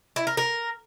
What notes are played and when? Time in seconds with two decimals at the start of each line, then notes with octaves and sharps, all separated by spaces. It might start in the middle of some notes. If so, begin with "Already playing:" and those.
0.16 E4
0.27 A#4
0.37 A#4